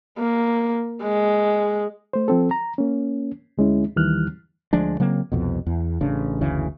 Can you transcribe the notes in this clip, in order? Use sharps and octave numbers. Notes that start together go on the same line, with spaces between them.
A#3
G#3
A3 C5
F3 C4 A4
A#5
A#3 C#4
D2 G#3 C#4 E4
D#2 D#3 E3 G3 F6 F#6
D2 F3 G#3 D4
C#3 F#3 A#3 C4
C2 F2 B2
E2
A1 C#3 D4
F#1 D2 C#3 E3